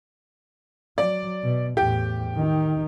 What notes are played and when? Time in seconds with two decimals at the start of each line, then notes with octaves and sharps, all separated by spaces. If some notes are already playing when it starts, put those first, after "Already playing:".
0.98 F#3 D5
1.43 B2
1.77 E2 A2 G4
2.35 D#3 D#4